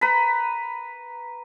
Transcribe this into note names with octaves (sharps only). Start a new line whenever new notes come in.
B4 A#5 B5